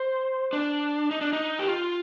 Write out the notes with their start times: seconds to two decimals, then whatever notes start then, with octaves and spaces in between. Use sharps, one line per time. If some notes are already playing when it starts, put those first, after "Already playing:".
Already playing: C5
0.53 D4
1.11 D#4
1.21 D4
1.33 D#4
1.59 G4
1.68 F4